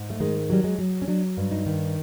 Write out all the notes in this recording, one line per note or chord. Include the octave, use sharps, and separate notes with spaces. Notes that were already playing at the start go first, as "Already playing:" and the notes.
Already playing: G#2
A3
D#3 G#3
F#3 G3
G#3
F#3
C#4
F#3 D4
G2
D#4
D#3